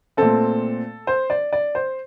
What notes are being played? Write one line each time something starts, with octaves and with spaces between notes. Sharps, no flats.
A#2 A3 C4 A4
C5
D5
D5
C5